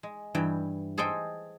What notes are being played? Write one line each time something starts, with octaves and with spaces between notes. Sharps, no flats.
G#3
G2 E3 G5
G#4 A4 C5 D#5 G5